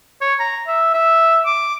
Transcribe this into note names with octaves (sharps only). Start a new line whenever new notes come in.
C#5
A#5
E5
E5
D6